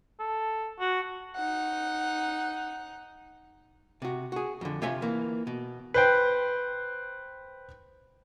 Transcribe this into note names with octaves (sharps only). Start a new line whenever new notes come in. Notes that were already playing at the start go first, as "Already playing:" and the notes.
A4
F#4
D#4 F#5
C3 F#4
F#4 G#4
F2 D3
C3 F4 C#5 E5 G#5
E3 A#3
B2
B4 C5 G5